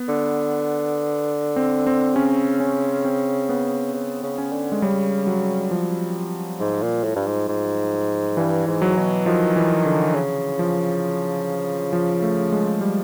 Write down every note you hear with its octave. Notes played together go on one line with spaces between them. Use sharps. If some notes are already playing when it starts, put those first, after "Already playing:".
Already playing: B3
D3
C4
C4
C#3 C#4
C#4
C4
B3
C#3
C#3
C#4
D3
G#3
C#3 G3
F#3
F3
G#2
A#2
A2
G2
G#2
G#2
G2 E3
G#2
F#3
B2
D#3 F3
E3
D3
C#3
F3
F3
A3
G#3
G3